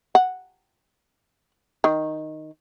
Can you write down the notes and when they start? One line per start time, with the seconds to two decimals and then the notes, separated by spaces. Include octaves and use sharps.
0.15 F#5
1.84 D#3